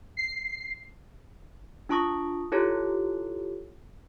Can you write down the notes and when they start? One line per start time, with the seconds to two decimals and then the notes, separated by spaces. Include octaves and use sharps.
0.17 C7
1.89 D4 F4 A5 C#6 D#6 A#6
2.52 E4 F4 G4 A4 C#5